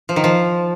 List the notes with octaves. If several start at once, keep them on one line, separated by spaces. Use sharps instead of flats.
F3
D#3
F3